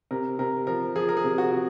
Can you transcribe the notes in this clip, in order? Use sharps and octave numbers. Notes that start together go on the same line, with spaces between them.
C3 A#4
C3 A#4
F3 A#4
F3 G#4
A#4
G#4
C3
F#4
C3